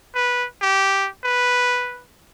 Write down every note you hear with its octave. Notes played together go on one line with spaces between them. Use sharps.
B4
G4
B4